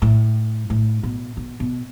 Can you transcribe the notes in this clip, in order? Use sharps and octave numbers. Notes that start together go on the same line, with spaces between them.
A2
A2
B2
B2
B2